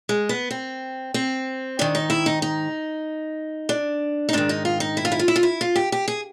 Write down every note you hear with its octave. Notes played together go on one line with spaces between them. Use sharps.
G#3
B3
C4
C4
G#2 D#3 D4
D#4
E4
D#4
D#4
D4
D#4
G#2 D#3 D4
D#4
F4
D#4
E4
F4
E4
F4
E4
F4
E4
F4
G4
G4
G#4